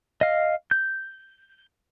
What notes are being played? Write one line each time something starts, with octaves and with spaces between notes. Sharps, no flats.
D#5 F5
G6